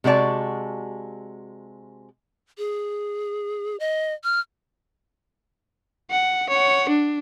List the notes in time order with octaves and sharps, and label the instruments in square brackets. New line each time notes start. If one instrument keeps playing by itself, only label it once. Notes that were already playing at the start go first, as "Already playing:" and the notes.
[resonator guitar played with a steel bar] C3 G#3 F#4 D5 A5
[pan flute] G#4
D#5
F6
[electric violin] F#5
C#5 F#5
D4